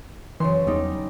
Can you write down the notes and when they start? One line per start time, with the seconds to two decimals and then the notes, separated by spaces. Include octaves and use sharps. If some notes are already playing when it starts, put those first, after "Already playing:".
0.40 F#2 C#3 E3 C6
0.67 E2 G3 D#4